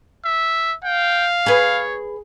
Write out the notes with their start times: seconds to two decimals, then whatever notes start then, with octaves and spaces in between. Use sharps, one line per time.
0.25 E5
0.84 F5 G5
1.46 G#4 B4 C#5